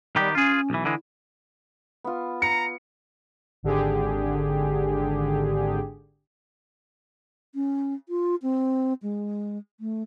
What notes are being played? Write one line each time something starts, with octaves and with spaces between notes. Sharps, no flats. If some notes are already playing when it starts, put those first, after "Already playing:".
D#3 G3 B3 G4
C#4 F4 G#4
B1 E3
D3 E3 G#3 E4
B3 F4
A#5 C#7
G#1 D3 G4 G#4
C#4
F4
C4
G#3
A3